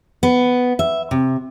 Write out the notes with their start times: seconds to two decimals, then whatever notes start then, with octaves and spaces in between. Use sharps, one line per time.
0.23 B3
0.79 E5
1.11 C3